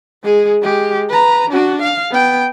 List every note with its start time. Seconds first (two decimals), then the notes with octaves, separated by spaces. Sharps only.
0.24 G#3 G#4
0.62 G#3 G4
1.09 B4 A#5
1.50 D4 F#4
1.82 F5
2.11 B3 G5